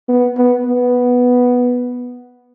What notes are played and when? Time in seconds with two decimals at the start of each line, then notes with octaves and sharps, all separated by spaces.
0.08 B3
0.38 B3
0.66 B3